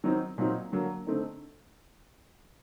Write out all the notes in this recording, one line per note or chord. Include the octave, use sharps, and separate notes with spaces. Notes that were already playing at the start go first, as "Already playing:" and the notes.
D#3 F#3 C4 D#4
A#2 F#3 C4 D#4
D3 F#3 A#3
D3 A3 C4 D#4